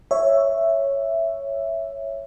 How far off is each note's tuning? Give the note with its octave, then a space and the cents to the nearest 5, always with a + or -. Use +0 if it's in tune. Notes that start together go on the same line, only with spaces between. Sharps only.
C#5 +0 E5 +5